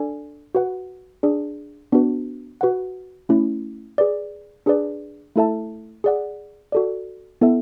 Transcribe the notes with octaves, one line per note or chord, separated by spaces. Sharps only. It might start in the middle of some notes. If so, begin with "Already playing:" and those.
Already playing: D4 A4 D5 G#5
F#4 B4 F#5
D4 G#4 D5
B3 D4 F#4 B4
F#4 B4 F#5
A3 C#4 E4
G#4 B4 D5
D4 G#4 B4 D5
A3 E4 A4 E5 A5
G#4 D5 F#5
F#4 A4 D5
B3 E4 A4 E5